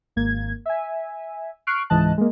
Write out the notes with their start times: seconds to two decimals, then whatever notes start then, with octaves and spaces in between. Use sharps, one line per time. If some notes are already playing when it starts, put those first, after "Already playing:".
0.16 G#1 A#3 G#6
0.66 E5 G#5
1.67 C#6 F6 F#6 C7 D7
1.90 C#2 G#2 E3 D#5 A5 F#6
2.18 G#3 A#3